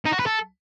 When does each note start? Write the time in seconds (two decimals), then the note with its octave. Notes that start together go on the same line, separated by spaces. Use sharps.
0.05 D#4
0.12 F#4
0.19 B4
0.26 A4